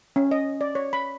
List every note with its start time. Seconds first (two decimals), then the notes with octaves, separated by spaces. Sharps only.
0.16 C#4
0.31 D#5
0.61 D5
0.75 C#5
0.93 B5